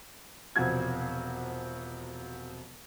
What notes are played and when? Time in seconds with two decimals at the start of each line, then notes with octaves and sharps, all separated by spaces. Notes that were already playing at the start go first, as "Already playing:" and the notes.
0.56 E1 C3 F3 F#4 G#6